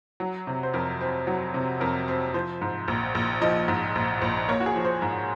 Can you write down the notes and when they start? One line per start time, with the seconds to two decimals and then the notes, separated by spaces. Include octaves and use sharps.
0.20 F#3
0.47 C3
0.63 C5
0.74 F2 A#4
1.01 C4
1.27 F#3
1.54 C3
1.80 F2 A#4
2.08 C4
2.34 F3 C5
2.61 G#2
2.88 A#1
3.15 A#1
3.41 F3 D#5
3.68 G#2
3.95 A#1
4.21 A#1
4.49 A#3 C#5
4.60 F#4
4.66 G#4
4.76 F3
4.85 C5
5.02 G#2